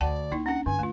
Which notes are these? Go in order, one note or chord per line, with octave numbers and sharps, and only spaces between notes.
D2 D5 F#5 G5 A5
C#2 A#3 D#4 E4
C#4 D4 F#5
G2 D3 G#5
D2 A3 F4